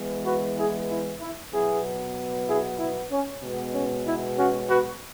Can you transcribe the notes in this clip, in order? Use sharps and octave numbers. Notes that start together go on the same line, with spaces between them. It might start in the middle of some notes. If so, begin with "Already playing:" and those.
Already playing: E3 G#3 B3
F#4 B4
E4 G#4
E4
E4
B2 F#3 B3 E4 G#4
E4 G#4
E4
C#4
B2 G#3 B3
C#4
E4
C#4 F#4
F#4 B4